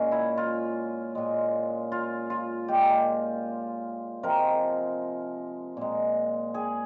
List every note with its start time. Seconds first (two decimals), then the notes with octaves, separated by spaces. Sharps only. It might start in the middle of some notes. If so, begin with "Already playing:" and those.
Already playing: A#2 G#3 C#4
0.12 E4
0.37 F4
1.15 A#2 G#3
1.92 F4
2.30 F4
2.68 G#3 G4
2.74 A#2
4.23 C3 F3 G#3 A#4
5.77 A#2 G#3
6.54 G#4